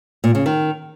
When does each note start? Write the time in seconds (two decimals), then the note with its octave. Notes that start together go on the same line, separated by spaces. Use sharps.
0.24 A#2
0.35 C#3
0.46 D#3